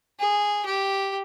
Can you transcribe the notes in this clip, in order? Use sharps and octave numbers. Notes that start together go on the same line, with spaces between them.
G#4
G4